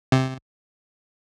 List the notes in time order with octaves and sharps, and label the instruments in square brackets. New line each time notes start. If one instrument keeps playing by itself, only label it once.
[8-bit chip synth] C3